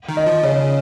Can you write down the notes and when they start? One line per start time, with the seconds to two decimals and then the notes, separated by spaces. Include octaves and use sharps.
0.09 D#3
0.17 D#5
0.26 F3
0.43 C#3 C#5